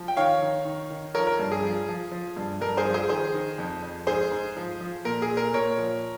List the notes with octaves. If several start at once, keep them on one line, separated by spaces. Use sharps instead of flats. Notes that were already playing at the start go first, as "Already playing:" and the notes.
Already playing: F3
G5
D#3 C#5 F5
D#3
D#3
D#3
F3 A#4 C#5
A#4
G2
G#4
F3
F3
F3
G2
G2 A#4
G#4 C5
F3
G#4 C5
D#3 G#4 C5
D#3
F2
F2
G#2 G#4 C5
G#2
F3
F3
A#2 A#4
G#4
A#2
A#4
A#2 A#4 C#5
F3